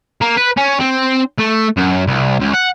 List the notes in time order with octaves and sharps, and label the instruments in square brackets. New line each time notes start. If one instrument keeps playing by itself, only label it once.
[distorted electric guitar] A#3
B4
C#4
C4
A3
F#2
C2
C#2
F#5